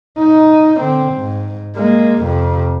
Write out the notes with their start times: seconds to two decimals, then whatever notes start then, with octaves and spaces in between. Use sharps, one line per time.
0.19 D#4
0.79 D3 C4
1.13 G#2
1.77 G#3 A#3
2.23 F2 C3